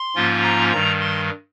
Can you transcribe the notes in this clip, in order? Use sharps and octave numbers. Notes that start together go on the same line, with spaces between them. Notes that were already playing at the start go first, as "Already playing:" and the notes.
Already playing: C6
G#2 F3 A#3 C#4 F4
A#5
G2 D#3 G3 A#5
C6